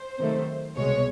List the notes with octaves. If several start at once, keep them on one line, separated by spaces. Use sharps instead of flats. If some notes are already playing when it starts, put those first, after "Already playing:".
Already playing: C5
C3 D#3 F#3 A3
C2 B2 G#3 C#5